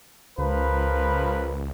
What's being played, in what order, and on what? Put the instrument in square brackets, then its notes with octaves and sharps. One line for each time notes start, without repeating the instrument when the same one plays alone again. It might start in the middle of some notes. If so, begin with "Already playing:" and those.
[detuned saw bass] C#2 [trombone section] F3 A#4 B4